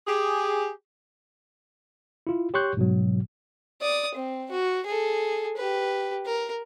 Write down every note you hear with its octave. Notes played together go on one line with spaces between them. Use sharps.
G4 G#4
E4 F4
G4 C#5 C6 C#6 F#6 G6
G#2 B2 F#3
D5 D#6
C4
F#4
G#4 A4
G4 B4
A#4